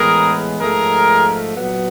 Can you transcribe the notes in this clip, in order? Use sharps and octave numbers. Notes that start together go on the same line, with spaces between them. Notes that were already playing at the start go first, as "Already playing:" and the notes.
Already playing: A2 E3 G#3 B3 G#4 A#4
G#2 F3 A3 G#4 A#4
A#2 F#3 B3